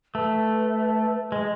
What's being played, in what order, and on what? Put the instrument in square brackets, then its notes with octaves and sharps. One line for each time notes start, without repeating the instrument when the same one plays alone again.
[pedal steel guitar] A3 [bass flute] B4
[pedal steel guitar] G#3 [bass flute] D#5